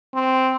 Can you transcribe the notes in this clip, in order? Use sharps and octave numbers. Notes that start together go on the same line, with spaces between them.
C4